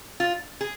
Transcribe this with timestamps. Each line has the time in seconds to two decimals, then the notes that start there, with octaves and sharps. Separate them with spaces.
0.20 F4
0.61 G#4